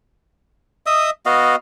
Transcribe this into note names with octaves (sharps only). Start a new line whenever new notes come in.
D#5 E5 D#6
B3 F#4 D#5 F5